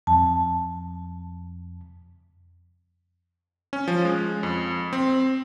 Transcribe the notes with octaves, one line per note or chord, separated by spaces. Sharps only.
F2 A5
C#4
F3
G#3
F2
C4